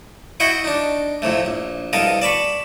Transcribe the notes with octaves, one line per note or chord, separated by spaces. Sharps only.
E4 F#4 D#5 F#5 G5 C#6
D4 D#4
F2 A2 C3 A3
A#1
C2 B2 A4 A#4 F5 D#6
D5 A5 B5 C#6